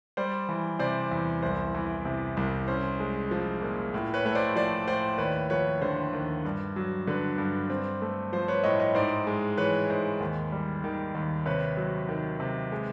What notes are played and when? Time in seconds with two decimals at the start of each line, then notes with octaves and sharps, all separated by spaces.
0.17 G3 C5 D5
0.49 E3
0.79 C3 C5 D5
1.11 E2
1.43 C2 C5
1.74 E3
2.05 C3
2.37 C2
2.68 C#4 C5
3.00 G#3
3.31 F3
3.62 A#2
3.94 A2
4.14 B4 C#5
4.25 A3 C#5
4.35 C5 D5
4.56 F3 C5 D5
4.88 A2 C5 D5
5.18 D#2 B4 C#5
5.50 F3 B4 C#5
5.82 D3 C5
6.13 D#2
6.45 G2
6.76 F#3
7.07 D3 B4
7.38 G2
7.70 C4
8.02 A3
8.33 F3 C5
8.48 B4 C#5
8.63 A2 C#5 D#5
8.80 C#5 D#5
8.95 G#2 C5 D5
9.27 G#3
9.58 E3 B4 C#5
9.90 G#2 C5
10.20 D#2
10.52 G3
10.84 D#3
11.15 D#2
11.46 C3 B4 C#5
11.77 F#3
12.09 D#3
12.40 C3
12.72 G#3